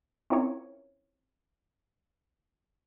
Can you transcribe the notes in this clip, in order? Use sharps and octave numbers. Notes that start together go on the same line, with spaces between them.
C4 C#4 E4 F4 A#4 C#5